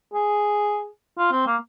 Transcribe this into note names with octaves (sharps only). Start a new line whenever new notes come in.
G#4
F4
C4
A#3